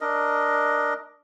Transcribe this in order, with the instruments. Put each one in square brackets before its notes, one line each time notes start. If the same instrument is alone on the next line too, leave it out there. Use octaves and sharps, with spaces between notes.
[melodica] D4 A#4 D#5